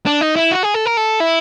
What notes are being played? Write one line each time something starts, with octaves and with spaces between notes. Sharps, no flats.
D4
D#4
E4
F#4
G#4
A4
A#4
A4
E4